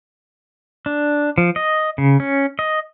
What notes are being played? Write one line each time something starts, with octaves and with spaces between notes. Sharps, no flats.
D4
F3
D#5
C#3
C#4
D#5